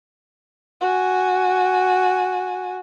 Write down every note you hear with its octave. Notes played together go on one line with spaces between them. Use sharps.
F#4 G#5